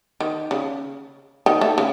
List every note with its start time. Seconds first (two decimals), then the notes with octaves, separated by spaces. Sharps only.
0.20 D#3
0.51 C#3
1.46 D#3
1.61 A3
1.78 C#3